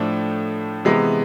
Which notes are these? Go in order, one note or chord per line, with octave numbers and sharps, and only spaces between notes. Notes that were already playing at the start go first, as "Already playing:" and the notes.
Already playing: A2 F3 A3 D4
C3 E3 G#3 B3